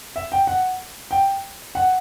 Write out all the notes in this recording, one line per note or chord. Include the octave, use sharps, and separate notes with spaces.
E5
G5
F#5
G5
F#5